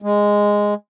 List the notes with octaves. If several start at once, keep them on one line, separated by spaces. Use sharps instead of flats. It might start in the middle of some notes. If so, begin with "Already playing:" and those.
G#3